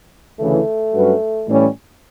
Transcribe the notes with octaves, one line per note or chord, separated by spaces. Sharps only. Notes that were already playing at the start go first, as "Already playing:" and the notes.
D2 C#3 E3 A3
G2 F#3 C#4 F#4 B4
A2 E3 G3 C#4